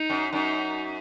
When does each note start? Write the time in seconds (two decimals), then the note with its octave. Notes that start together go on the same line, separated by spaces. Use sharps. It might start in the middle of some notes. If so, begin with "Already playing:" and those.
Already playing: D#4
0.10 F#2
0.32 F#2 D#4